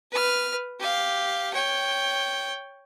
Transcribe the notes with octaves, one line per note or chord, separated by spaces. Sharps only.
B4 F6
G4 F5
C#5 G5